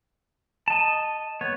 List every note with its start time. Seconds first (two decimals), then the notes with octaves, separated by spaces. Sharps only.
0.68 D#5 A5
1.41 B3 C#5